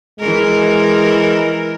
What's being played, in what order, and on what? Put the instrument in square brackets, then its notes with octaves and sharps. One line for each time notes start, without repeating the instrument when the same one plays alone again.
[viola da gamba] E3 A#4 [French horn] G#3